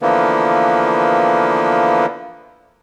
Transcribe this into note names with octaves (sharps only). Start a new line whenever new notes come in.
D3 E3 F3 A#3 B3